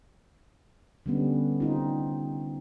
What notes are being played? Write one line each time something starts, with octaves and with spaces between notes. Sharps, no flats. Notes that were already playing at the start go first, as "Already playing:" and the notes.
D3 G3 B3 C#4
C4 D#4 F4